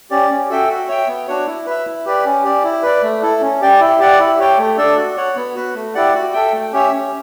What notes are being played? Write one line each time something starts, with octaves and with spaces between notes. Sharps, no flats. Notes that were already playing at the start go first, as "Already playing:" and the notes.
C#4 G4 D5
C#4
F#4 A4 E5 G5
F#4
C#5 E5 G5
B3
D4 F#4 C#5
E4
B4 E5
E4
G4 B4 D5
C#4
G4 D5
E4
B4 D5
A3
E4 A4
C#4
G4 D5 G5
E4
G4 D5 F#5
E4
G4 C#5 G5
A3
D4 A4 D5
F#4
C#5 F#5
B3
F#4 B4
A3
E4 G4 D5 F#5
F#4
A4 E5 G5
A3
C#4 G4 C#5 E5
C#4